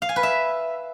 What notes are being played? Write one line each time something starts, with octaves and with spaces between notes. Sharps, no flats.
F5
G#5
B4
E5